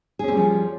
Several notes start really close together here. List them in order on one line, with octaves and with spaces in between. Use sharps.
G#4 C#4 C4 G3 F3